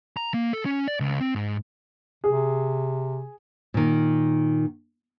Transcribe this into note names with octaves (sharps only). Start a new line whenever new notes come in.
A#5
A#3
A4
C#4
D5
C#2
C4
G#2
C3 G#4
A#2 D#3